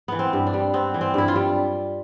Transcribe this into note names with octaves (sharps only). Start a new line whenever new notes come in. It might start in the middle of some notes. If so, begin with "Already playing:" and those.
E3 B3
C4
G2
D4
G3
B3 C4
E3
C4
G2 E4
F4
G3